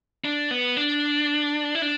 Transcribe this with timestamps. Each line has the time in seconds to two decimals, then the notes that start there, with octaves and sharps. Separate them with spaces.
0.25 D4
0.51 B3
0.77 D4
1.75 E4
1.82 D4